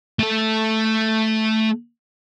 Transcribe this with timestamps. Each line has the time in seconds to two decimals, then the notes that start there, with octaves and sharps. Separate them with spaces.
0.19 A3 A4